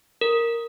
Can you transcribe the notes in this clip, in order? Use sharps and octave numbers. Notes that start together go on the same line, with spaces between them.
A#4